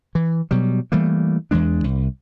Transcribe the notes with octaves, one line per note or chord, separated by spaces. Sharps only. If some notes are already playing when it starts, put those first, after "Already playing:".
E3
B2 F#3 G3
E3 G3 A3 A#3
E2 E3 G#3 D4
C2